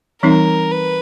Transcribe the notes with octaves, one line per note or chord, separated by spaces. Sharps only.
E3 G3 C4 D#4 A#4
B4